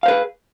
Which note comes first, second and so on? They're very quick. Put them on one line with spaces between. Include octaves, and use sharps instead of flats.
F5 C5 B4 G#4